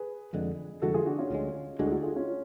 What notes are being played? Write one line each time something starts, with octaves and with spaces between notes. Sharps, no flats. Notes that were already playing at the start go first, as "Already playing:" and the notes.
Already playing: G#4 B4
F1 F2 D3 G#3
F1 F2 D3 G#3 F#4 A4
F4 G#4
D4 F#4
C#4 F4
D2 D3 G#3
D2 D3 G#3 D4 F#4
G#4
F#4 A4
F4 G#4
C#4 F4